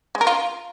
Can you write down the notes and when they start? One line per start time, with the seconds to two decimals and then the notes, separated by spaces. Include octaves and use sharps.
0.15 G#3
0.21 A#4
0.27 F4